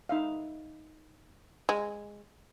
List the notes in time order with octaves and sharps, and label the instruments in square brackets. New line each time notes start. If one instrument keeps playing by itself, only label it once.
[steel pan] D#4 E5 F5
[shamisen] G#3